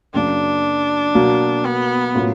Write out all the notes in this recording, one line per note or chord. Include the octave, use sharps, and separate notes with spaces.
F#2 C#3 F#3 A#3 D4
B2 F#3 A#3
B3
A2 F#3 A#3 C#4 F4